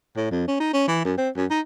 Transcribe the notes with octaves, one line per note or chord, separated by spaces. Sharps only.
A2
F2
C#4
D#4
C#4
E3
F#2
C4
F#2
D#4